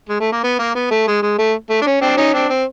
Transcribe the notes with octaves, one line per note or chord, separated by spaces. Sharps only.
G#3
A3
A#3
B3
A#3
B3
A3
G#3
G#3
A3
A3
D4
C#4
C4 D4
C#4 D#4
C4 D4
C4